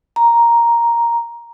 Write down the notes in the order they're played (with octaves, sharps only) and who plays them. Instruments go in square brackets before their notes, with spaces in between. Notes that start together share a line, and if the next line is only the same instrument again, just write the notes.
[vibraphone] A#5